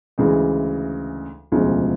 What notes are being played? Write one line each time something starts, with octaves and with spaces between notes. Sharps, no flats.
D2 C#3 E3 G#3
E1 D2 C#3 F3 G#3